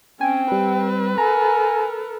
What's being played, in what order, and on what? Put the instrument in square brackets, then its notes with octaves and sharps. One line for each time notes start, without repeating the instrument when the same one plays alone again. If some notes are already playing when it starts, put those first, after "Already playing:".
[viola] C4 [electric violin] C#4 [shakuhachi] G5 [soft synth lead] G#5
[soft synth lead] G3 [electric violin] B4
[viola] A4 A#4 [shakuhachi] G#5 [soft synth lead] A#5